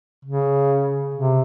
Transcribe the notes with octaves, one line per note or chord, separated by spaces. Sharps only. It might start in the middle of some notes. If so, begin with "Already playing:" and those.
C#3
C3